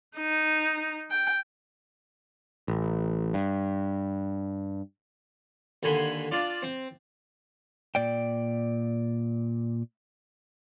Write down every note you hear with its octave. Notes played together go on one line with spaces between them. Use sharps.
D#4
G5
A1
G2
D#2 D3 G#5 B5 C6
D4 F4 D5
C4
A#2 D5 G5